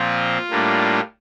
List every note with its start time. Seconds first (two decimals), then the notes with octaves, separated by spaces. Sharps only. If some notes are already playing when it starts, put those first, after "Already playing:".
Already playing: A#2 F3 C4 F4
0.50 A2 G3 A#3 D4